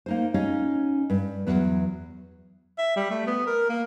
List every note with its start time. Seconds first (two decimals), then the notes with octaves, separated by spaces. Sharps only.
0.06 A#3 D#4 C5
0.34 C#4 D#4 C#5 D#5 F5
1.10 G2
1.47 E2 F#3 B3
2.78 E5
2.96 G3
3.11 A3
3.27 B3
3.47 A#4
3.69 A#3